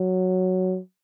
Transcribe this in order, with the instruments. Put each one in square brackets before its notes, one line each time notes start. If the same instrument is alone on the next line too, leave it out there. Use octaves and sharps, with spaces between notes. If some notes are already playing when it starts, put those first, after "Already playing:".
Already playing: [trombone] F#3